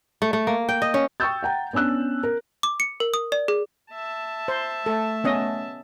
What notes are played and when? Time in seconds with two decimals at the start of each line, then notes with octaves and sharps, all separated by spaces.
0.22 A3
0.33 A3
0.47 A#3
0.69 G5
0.82 D#5
0.94 C#4
1.20 G5 C#6 D#6 E6 G6 A6
1.43 F#5 G5 A#5
1.73 B3 C#4 D4 E6 F#6
2.23 A#4
2.63 D6
2.80 C#7
3.00 A#4
3.14 D#6
3.32 D5
3.48 G#4
3.92 E5 A5
4.48 C5
4.86 A3 A4
5.24 B3 C#4 D#5